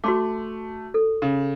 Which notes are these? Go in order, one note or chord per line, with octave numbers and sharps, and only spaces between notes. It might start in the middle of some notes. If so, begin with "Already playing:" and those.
A3 F#4 C6 D6
A4
C#3